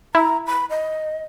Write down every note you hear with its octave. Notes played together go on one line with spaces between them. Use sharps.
E4 A#5
B5
D#5